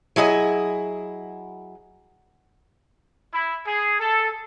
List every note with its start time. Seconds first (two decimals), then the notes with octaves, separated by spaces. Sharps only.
0.16 F#3 E4 G#4 D#5
3.33 E4
3.65 G#4
3.99 A4